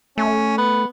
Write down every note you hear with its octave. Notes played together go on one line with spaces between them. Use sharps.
A3 C#4
B3